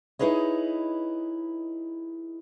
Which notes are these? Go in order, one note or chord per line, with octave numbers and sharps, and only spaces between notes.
D#4 E4 G#4 B4 C#5 D#5